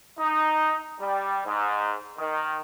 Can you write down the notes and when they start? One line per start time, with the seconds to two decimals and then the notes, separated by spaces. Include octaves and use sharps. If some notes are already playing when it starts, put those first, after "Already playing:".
0.19 D#4
1.00 G3
1.46 G#2
2.18 D#3